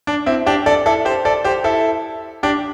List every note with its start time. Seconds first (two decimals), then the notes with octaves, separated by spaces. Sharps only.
0.07 D4
0.26 C4 E4
0.46 D4 G4
0.66 A4 D5
0.86 E4 A4
1.05 G4 C5
1.25 A4 D5
1.44 G4 C5
1.64 E4 A4
2.43 D4 G4